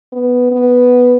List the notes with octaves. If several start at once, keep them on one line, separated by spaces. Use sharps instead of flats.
B3
B3